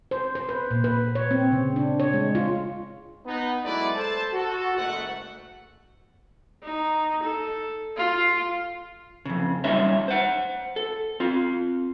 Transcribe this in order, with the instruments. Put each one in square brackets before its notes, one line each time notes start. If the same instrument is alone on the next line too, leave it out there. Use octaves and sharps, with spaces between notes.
[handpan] C5
C5
B4
A#2
B4
C#5
C4
C#3
D4
C#5
G#3
F4
[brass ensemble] B3 D#4 B4
F#3 G#3 A3 E4 B4 D5
A4 C5 A5
F#4 A4
F#1 G#2 A3 F#5
[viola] D#4
A4
F4
[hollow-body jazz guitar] F2 C#3
G3 C#4 D#4 C#5 E5
C5 F#5
A4
C4 F4